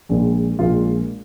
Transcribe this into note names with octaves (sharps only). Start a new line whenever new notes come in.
A#1 A#2 G#3
A#1 A#2 G#3 F4